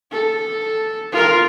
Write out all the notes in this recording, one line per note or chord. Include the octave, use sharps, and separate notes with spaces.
A4
F4 A#4